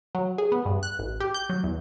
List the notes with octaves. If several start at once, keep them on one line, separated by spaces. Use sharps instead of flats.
F#3
G#4
B3
G2
F#6
A1
G4
G6
F#3
E2